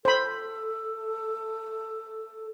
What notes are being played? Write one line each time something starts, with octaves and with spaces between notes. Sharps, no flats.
A4 C5 B5